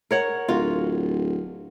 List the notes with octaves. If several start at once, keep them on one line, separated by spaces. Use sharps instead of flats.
A#4 C#5 F#5
D1 F4 F#4